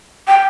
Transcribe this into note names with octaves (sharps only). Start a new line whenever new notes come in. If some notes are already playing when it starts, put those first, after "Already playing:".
G5